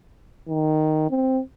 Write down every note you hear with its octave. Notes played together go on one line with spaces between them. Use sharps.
D#3
C4